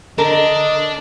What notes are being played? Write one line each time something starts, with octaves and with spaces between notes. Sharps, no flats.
D3 D4 A#4 D#5